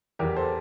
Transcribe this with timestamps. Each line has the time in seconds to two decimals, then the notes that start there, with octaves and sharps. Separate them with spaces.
0.19 E2 E3 G4 A#4
0.36 A4 C5